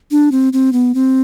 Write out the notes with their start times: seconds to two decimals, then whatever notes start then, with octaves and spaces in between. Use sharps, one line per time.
0.11 D4
0.32 C4
0.53 C4
0.73 B3
0.94 C4